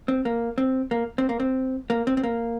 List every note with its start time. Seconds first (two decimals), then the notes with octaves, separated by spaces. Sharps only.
0.08 C4
0.25 A#3
0.58 C4
0.91 A#3
1.18 C4
1.29 A#3
1.40 C4
1.90 A#3
2.07 C4
2.17 C4
2.23 A#3